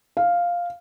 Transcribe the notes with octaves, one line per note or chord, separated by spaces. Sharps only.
F5